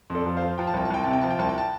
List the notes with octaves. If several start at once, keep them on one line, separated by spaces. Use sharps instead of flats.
F2
A4 D5
F3
C5 F5
F3
F3 G5
A5
C2 G5
A5
C2 G5
C3 A5
G5
F3 A5
G5
C2 A5
G5
A5